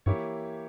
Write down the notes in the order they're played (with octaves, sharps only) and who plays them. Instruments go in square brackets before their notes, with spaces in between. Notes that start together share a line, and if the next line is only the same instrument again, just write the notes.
[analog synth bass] G2 [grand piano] E3 A#3 E4 G4 C#5